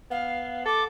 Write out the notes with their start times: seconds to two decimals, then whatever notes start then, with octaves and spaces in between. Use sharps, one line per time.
0.11 B3 F5
0.65 A4 D6